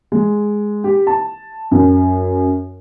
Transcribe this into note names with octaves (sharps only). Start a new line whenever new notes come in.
G#3
G4
A5
F#2